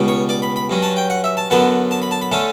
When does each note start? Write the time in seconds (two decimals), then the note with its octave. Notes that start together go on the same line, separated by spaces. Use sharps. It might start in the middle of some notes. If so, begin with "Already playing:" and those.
Already playing: C#2 B2 G3
0.08 C#5
0.29 D5
0.42 B5
0.56 B5
0.70 G2 F#3 C#4
0.82 A5
0.96 G5
1.10 F#5
1.24 E5
1.37 A5
1.50 F#2 D3 F#3 B3 A5
1.91 A5
2.02 B5
2.11 A5
2.21 B5
2.32 D3 A3 C#4 A5